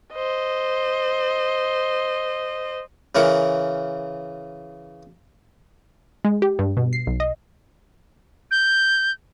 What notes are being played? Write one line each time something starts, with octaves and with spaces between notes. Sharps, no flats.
C5 D#5
C#3 E3 A#4 F#5
G#3
G4
G2
B2
C7
B1
D#5
G6